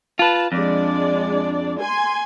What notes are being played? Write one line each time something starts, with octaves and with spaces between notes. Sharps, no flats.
F4 B4 A5
F2 G#3 D4 D5
G#5 C6